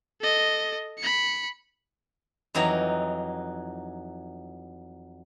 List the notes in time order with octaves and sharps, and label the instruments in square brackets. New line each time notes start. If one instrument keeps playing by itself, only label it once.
[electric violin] A4 D#5
B5 C#7
[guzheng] F2 E3 F#3 D#4 A#5